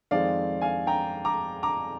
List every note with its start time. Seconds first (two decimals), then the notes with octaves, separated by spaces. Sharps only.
0.11 F2 D#3 G#3 C4 D5 F5
0.61 F5 G#5
0.87 G5 A#5
1.25 A#5 D6
1.63 A#5 D6